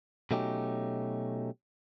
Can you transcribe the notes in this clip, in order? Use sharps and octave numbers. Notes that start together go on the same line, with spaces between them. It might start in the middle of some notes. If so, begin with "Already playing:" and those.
B2 F#3 A3 C#4 D#4 G4